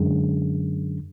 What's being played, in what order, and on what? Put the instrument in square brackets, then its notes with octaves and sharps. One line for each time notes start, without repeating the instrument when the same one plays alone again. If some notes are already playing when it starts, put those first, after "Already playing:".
Already playing: [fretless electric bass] F#2 D3 G#3